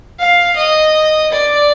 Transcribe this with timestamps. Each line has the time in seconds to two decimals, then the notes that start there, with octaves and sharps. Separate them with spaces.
0.19 F5
0.57 D#5
1.33 D5